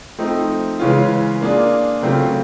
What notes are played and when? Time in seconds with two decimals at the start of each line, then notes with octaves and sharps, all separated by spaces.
0.18 F3 A3 C4 D#4
0.79 C#3 E3 G#3 C#4 F4
1.41 A#3 D4 F4 G#4
2.02 C#3 F#3 A3 C4 F4